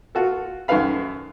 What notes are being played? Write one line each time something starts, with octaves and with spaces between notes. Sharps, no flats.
F4 F#4 A4
F#2 D#3 A3 B4 F5 B5